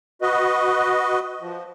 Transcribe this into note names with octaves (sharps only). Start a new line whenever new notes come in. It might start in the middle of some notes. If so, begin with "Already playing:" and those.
F#4 B4 D#5
F3